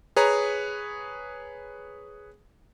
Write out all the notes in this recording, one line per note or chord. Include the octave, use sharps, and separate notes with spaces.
G#4 B4 C#5 A#5